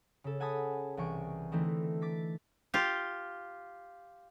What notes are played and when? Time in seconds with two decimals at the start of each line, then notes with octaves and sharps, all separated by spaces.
0.24 C#3 A4
0.40 F#5 G#5 A5 B5 D#6
0.97 C2 E3 G#5 C#6 D7
1.52 D3 E3 A3 C4 D#4 E4
2.02 D6 A6 B6
2.74 F4 G4